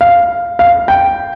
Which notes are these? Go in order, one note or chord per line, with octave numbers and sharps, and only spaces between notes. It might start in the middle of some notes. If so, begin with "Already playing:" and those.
F5
F5
G5